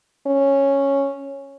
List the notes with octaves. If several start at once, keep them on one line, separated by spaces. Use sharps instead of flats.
C#4